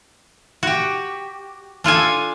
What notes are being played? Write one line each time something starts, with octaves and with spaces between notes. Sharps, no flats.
F#4 G4
D4 F4 A4 G#5